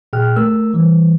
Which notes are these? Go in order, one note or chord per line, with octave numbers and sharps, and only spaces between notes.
A#2 G#4 G5 F6 F#6
A3 A#4 E6
E3 G3